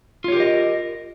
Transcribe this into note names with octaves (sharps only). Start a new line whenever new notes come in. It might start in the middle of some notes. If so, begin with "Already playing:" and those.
F4 G4 A#4 C#5 D#5